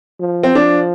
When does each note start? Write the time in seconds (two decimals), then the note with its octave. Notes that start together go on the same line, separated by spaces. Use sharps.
0.19 F3
0.43 C4
0.55 F3 D4